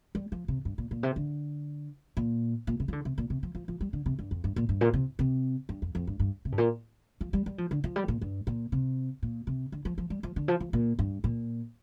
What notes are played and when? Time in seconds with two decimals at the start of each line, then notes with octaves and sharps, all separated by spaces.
0.15 G3
0.32 F3
0.48 C3
0.65 G2
0.78 A#2
0.91 A#2
1.03 C3
1.16 D3
2.17 A#2
2.67 A#2
2.80 C3
2.88 F3
2.93 D3
3.05 C3
3.18 A#2
3.30 C3
3.43 F3
3.55 F3
3.68 F3
3.81 G3
3.93 D3
4.06 C3
4.19 G2
4.31 F2
4.44 G2
4.56 A#2
4.69 G2
4.81 A#2
4.94 C3
5.19 C3
5.69 G2
5.82 F2
5.95 F2
6.07 G2
6.19 G2
6.45 C3
6.52 G2
6.58 A#2
7.21 F3
7.33 G3
7.46 G3
7.58 F3
7.71 D3
7.84 F3
7.96 G3
8.08 A#2
8.21 G2
8.47 A#2
8.72 C3
9.22 A#2
9.47 C3
9.72 D3
9.85 F3
9.98 F3
10.10 G3
10.23 F3
10.36 D3
10.48 F3
10.60 F3
10.73 A#2
10.99 G2
11.24 A#2